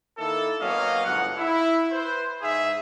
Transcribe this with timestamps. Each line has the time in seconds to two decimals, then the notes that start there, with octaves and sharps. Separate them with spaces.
0.18 D#3 A#3 E4 A4
0.60 F#3 A#3 B3 C#4 D#5 F5
1.04 G1 G#2 B2 F#5
1.37 E4
1.91 B4 C5
2.42 G#2 G#4 E5